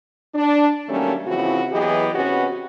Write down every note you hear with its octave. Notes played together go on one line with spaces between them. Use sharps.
D4
D#3 F#3 G3 A3 A#3 C#4
C#3 E3 F3 C4 E4 F#4
E3 F#3 B3 G4 G#4 D#5
C3 B3 C#4 F#4 B4